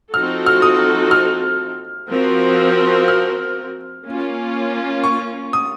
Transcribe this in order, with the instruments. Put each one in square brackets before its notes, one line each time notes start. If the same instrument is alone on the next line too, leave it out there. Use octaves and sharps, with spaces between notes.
[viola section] F3 C4 D#4 F#4 A4 [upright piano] F6
[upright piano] F6
D#6
F6
[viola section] F3 C4 F#4 A#4
[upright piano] F6
[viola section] A#3 C#4 F4
[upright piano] C#6
D#6